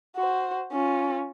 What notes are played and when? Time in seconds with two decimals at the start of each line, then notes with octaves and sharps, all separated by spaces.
0.16 F#4 C5
0.72 C#4 F4